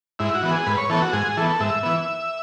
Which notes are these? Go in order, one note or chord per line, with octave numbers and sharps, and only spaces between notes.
G#2 E4
F#4
E3 B3
G#4
G#2 B4
C#5
E3 B3 A4
F#4
G#2 G#4
E3 B3 A4
G#2 E5
E3 B3